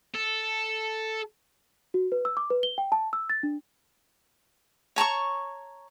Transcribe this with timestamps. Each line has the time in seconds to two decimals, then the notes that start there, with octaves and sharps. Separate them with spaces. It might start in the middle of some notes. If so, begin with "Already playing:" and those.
0.15 A4
1.94 F#4
2.12 B4
2.25 E6
2.37 D6
2.50 B4
2.63 G7
2.78 G5
2.92 A5
3.13 E6
3.30 A6
3.43 D4
4.96 C#5 A5 A#5 C#6